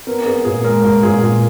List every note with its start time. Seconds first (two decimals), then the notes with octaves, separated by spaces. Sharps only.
0.07 B3 A#4
0.26 B3 G#4
0.45 A#2 G#4
0.64 G#3 A#4
0.83 A#2 A#4
1.03 A#2 G#4
1.22 A#2